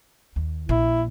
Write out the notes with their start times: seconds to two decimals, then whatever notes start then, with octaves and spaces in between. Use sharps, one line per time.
0.36 D#2
0.69 A#1 A#2 E4